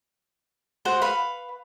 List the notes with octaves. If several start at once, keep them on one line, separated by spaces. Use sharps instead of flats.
F#4 C5 F#5 C6
B4 F5 B5 C#6